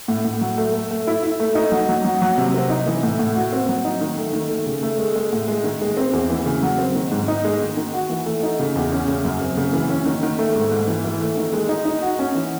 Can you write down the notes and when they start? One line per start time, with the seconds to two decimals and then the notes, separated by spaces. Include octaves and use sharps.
0.08 A2
0.24 A2
0.41 F#3
0.58 A3
0.74 A3
0.91 A3
1.07 E4
1.23 E4
1.40 A3
1.55 D#4
1.72 F#3
1.89 F#3
2.05 F#3
2.22 F#3
2.38 C3
2.54 C4
2.70 D#4
2.86 E3
3.03 A2
3.19 A2
3.35 F#4
3.53 C4
3.69 F#3
3.85 D#4
4.01 D#3
4.18 A3
4.33 D#3
4.50 A3
4.66 C#3
4.83 A3
4.99 G#3
5.15 G#3
5.32 A2
5.48 G#3
5.64 D#3
5.81 G#3
5.97 C4
6.13 E2
6.30 E3
6.46 C#3
6.62 F#3
6.79 C4
6.96 D#3
7.12 G#2
7.28 D#4
7.45 G#3
7.61 D#3
7.77 D#3
7.93 F#4
8.09 E3
8.26 A3
8.43 D#4
8.59 C#3
8.76 E2
8.92 C#4
9.08 C#3
9.25 F#2
9.41 C4
9.57 C#3
9.73 E3
9.90 C#4
10.06 D#3
10.23 D#3
10.39 A3
10.55 G#2
10.71 G#2
10.87 E3
11.04 E3
11.21 A3
11.37 D#3
11.53 G#3
11.69 D#4
11.85 D#4
12.02 F#4
12.19 C#4
12.35 E3